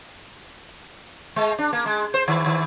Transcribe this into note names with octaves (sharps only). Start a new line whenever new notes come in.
G#3
D4
A#3
G#3
C5
D#3
D#3